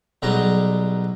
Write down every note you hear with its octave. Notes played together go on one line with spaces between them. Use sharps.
B1 F#3 G3 G#4 A#5